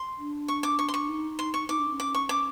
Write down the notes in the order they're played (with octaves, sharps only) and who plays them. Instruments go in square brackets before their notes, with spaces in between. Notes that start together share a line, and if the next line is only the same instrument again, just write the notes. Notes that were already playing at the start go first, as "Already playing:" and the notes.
Already playing: [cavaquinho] C6
[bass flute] D4
[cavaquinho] C#6
D6
C#6
C6
C#6
[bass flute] D#4
[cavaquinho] C6
C#6
[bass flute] D#4 [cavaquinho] D6
[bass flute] D4
C#4
[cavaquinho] D6
C#6
D6